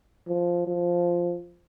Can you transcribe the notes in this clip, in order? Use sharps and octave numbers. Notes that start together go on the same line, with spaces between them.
F3
F3